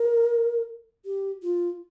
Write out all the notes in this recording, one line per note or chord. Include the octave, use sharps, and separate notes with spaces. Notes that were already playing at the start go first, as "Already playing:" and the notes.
Already playing: A#4
G4
F4